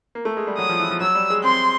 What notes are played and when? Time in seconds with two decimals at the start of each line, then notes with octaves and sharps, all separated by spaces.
0.15 A#3
0.25 A3
0.37 G#3
0.47 G3
0.58 F#3 D#6
0.69 F3
0.79 E3
0.91 F3
1.01 F#3 E6
1.15 G3
1.30 G#3
1.44 C4 C6